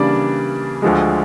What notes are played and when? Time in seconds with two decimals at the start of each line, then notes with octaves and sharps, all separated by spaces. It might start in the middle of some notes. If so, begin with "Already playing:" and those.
Already playing: C#3 E3 G3 A#3 D4 D5
0.82 D2 D3 F3 G#3